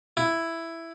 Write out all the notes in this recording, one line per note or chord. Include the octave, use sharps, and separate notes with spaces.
E4